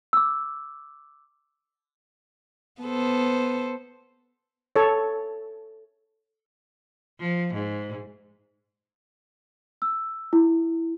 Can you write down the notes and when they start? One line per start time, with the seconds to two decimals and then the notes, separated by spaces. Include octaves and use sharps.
0.13 D6 E6
2.82 B3 A4 C5
4.76 A4 C#5
7.20 F3
7.54 G#2
9.82 E6
10.33 E4